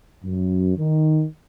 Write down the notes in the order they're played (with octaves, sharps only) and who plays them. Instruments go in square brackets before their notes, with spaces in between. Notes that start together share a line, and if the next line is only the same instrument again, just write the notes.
[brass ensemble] F#2
D#3